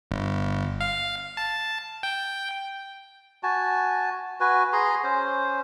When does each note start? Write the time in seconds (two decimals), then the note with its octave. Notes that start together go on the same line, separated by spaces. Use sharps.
0.11 G1
0.81 F5
1.37 A5
2.03 G5
3.43 F#4 G#5 A5
4.40 F#4 B4 G#5
4.73 G#4 A#5 C6
5.04 C#4 C5